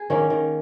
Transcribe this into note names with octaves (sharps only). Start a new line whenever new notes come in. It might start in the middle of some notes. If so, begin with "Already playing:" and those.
Already playing: G#4
D#3 A#3 C#4
D#3